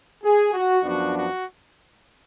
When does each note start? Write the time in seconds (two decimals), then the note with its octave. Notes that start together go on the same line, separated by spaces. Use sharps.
0.23 G#4
0.54 F#4
0.84 F#2 F3 B3 D4 F#4
1.15 F#4